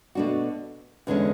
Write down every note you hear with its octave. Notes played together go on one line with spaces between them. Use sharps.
B2 A3 D4 F#4
E2 D3 G#3 C#4